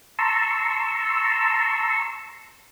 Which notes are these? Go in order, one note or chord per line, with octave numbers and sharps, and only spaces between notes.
A5 A#5 C6 C#6 E6